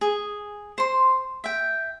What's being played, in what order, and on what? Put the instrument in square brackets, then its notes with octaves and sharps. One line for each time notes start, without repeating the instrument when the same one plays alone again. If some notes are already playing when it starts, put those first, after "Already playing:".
[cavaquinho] G#4
C5 C6
E5 G5